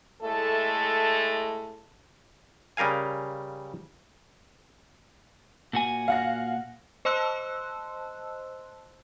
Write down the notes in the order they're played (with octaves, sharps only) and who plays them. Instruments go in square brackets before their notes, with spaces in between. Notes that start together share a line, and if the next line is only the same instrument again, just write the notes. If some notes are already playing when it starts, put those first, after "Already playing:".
[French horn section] A2 G#3 A3 A4
[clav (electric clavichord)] C#3 G3 A#4 F5 G#5
[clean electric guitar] A#2 F#4 G#5
[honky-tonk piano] F5 F#5 A#6
[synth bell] C5 D#5 A5 C6 E6 F#6